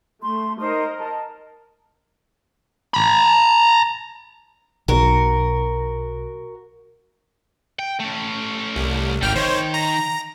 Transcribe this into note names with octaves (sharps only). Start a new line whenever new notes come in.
A3 C6
D#4 A#4 C5 D#5
A5
A#5 B5
B1 F#4 A#4
G5
A3 C#4
C2
G#1 G3 A#3 G5 F6
D#3 C5 C#5
A#5 A#6